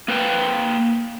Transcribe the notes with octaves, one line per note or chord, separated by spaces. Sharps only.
A#3 B4 G5